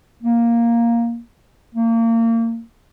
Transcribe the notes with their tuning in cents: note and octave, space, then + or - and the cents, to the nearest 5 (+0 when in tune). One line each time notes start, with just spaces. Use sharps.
A#3 +5
A#3 -30